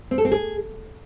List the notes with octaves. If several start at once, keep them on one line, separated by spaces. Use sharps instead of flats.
C4
A4
C4
G#4